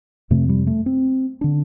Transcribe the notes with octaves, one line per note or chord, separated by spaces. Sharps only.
F2 C3 A3
G3
A3
C4
D3 D4